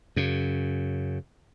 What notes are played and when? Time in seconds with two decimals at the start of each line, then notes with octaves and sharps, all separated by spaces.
0.16 F#2 C#3